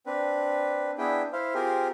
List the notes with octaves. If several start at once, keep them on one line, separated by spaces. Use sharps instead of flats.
C4 D4 B4
B3 D4 E4 G#4 G5
E4 C5 F5
C4 F4 G4 G#4 A#4